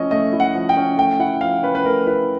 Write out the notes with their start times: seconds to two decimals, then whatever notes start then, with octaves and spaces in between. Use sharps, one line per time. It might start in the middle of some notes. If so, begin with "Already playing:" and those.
Already playing: F3 A3 C#4 E4 D#5
0.11 A3 D#5
0.33 E4
0.40 F#5
0.55 F3
0.69 G5
0.77 C#4
0.98 A3 G5
1.19 E4 F#5
1.41 F3 F5
1.63 C#4 B4
1.75 B4
1.85 A3 A#4
2.07 E4 B4